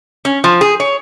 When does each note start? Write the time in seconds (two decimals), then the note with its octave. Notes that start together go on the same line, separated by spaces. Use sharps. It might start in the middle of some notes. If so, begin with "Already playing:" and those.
0.25 C#4
0.44 F3
0.61 G#4
0.80 C#5